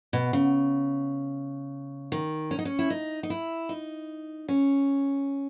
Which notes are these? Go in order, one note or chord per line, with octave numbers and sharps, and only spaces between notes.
B2
C#3
D#3
C#4
D#4
C#4
E4
D#4
D#4
E4
D#4
C#4